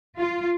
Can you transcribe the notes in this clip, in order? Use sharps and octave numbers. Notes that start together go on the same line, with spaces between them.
F4